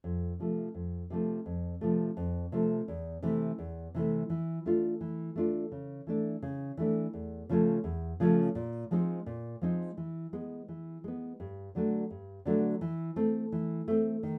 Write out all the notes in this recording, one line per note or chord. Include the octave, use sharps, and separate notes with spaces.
F2
C3 F3 A3
F2
C3 F3 A3
F2
C3 F3 A3
F2
C3 F3 A3
E2
C3 E3 A3
E2
C3 E3 A3
E3
A3 D4 F4
E3
A3 D4 F4
C#3
E3 A3 D4
C#3
E3 A3 D4
E2
C#3 F3 A3 C#4
E2
C#3 F3 A3 C#4
A#2
F3 G#3 C4 D#4
A#2
F3 G#3 C4 D#4
E3
G#3 B3
E3
G#3 B3
G2
D3 F#3 A3 D4
G2
D3 F#3 A3 D4
E3
A3 C4
E3
A3 C4
D#3